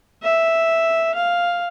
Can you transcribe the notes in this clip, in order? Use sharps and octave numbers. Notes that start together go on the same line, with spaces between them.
E5
F5